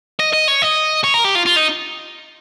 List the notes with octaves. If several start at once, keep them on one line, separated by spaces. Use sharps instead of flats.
D#5
D#5
C#5
D#5
C#5
A#4
G4
F4
F4
D#4